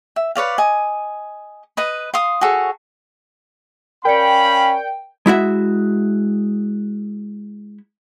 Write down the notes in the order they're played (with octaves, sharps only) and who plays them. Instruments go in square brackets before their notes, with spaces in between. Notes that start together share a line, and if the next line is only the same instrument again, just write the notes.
[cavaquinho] E5
B4 C#5 D5 F5
D#5 G#5
B4 D#5 B5
F5 C6 D#6
F#4 G#4 A4 C#5
[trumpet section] C#4 F5 B5 [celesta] A#4 D5 C#7 [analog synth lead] G5
[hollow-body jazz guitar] G#3 E4 F#4 E5